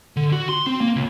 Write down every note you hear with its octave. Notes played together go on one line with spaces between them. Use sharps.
D3
F#4
C6
C4
A#3
C#2